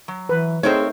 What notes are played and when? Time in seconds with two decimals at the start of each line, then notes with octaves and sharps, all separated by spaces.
0.08 F#3
0.29 E3 B4
0.63 A3 C4 D#4 G#4 A#4 C5 C#5